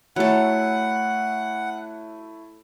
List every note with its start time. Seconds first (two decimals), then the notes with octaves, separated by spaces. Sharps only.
0.16 F#3 A3 E4 A4 F#5